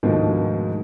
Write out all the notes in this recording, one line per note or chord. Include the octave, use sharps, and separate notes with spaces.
D2 G#2 B2 D#3 F3 G#3